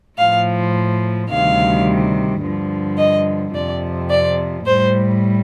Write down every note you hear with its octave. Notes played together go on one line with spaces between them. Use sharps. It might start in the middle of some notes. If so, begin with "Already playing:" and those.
A2 F3 F5
D2 C3 D#3 G3 F5
G2 D3 F3
D#5
F2 C3 F3 D5
D5
A2 G3 C5